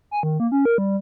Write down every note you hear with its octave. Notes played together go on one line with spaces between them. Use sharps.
G#5
D#3
A#3
C#4
A#4
G3